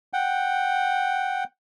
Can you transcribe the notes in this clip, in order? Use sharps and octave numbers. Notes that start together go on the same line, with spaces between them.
F#5 G5